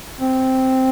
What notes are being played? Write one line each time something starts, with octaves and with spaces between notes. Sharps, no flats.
C4